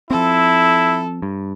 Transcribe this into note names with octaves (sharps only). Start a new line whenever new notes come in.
F3 C4 E4 A4
G2